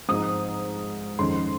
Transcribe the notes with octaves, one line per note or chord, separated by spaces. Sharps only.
G#2 F3 C4 D#4 D#6
F2 D#3 G#3 C#4 C6